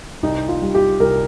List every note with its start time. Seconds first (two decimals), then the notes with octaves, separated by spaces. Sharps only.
0.23 C2 D#4
0.48 F4
0.62 G3
0.74 G4
1.00 C2 A#4